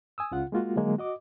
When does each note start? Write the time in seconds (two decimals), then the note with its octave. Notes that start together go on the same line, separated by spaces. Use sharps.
0.18 G#5 D#6 E6
0.31 C#2 C#3 F4 F#5
0.52 G#3 A#3 F4 F#4
0.76 D3 F#3 G#3 A#3
0.98 F#4 D#5 D6